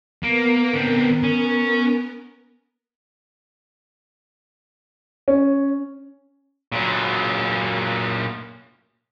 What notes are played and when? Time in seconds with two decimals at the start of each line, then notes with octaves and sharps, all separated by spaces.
0.23 A#3 B3 A#4
0.74 D3 C4
1.23 C#4
5.28 C#4
6.72 A#2 F#3